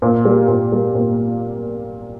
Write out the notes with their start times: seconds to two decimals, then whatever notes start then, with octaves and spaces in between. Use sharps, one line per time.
0.02 A#2
0.25 G3 A#3
0.48 A#2
0.71 G3 A#3
0.95 A#2